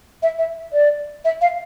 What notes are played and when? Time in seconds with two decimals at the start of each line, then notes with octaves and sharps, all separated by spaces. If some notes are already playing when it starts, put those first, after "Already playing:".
0.23 E5
0.39 E5
0.73 D5
1.25 E5
1.41 F5